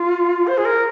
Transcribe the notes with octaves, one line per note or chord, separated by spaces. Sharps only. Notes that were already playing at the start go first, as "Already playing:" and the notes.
Already playing: F4
C5
G#4
A#4